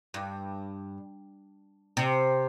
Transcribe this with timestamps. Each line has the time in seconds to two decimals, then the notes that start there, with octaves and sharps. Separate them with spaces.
0.14 G2
1.97 C3